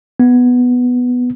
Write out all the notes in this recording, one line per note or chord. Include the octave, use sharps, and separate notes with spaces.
B3